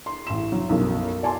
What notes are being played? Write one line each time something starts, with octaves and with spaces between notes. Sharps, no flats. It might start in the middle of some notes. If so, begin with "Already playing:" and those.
C6
A1 E7
F#3
B1 F#2
D5 G#5 A5 C6